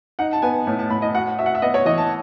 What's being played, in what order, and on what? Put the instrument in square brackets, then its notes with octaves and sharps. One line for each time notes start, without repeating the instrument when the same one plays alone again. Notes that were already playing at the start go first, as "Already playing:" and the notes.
[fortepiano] D#4 [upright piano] F#5
[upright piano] A5
[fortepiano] B3 [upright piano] G#5
[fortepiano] A2
[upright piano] A5
[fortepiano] A2 [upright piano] B5
[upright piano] D#5
[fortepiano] F#4 [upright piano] F#5
[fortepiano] F#4 [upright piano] E5
[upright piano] F#5
E5
[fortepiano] B3 [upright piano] D#5
[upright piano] C#5
[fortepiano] E3 [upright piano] D#5
[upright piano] A5